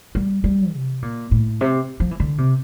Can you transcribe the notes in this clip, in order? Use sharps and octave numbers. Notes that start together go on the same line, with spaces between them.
G3
G3
C3
A#2
A2
C3
F3
E3
D3
C3